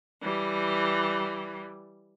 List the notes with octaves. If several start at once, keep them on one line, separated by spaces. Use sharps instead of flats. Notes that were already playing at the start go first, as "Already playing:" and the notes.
E3 G3